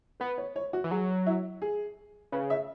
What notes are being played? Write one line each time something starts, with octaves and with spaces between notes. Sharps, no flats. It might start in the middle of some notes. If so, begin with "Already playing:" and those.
B3 B4
C#5
C#5
F#4
E3
F#3 G#4
E4
G#4
C#3 B4
E5